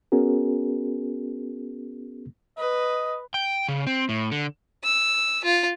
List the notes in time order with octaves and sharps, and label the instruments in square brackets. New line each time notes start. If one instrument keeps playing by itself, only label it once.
[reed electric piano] B3 C#4 F#4 G#4 A#4
[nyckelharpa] B4 [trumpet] D#5
[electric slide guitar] G5
C#3
C4
A2
D3
[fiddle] E6
F4